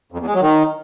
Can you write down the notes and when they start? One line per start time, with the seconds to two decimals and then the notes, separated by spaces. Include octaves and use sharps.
0.12 F2
0.19 E2
0.27 G#3
0.34 F#3
0.42 D#3